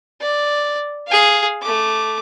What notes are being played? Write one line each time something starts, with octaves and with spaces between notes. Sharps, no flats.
D5
G#4 F5
A3 D6